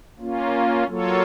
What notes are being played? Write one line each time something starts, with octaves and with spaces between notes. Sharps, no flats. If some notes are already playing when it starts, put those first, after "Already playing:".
A#3 C#4 F4
F#3 A#3 F4 A4 C#5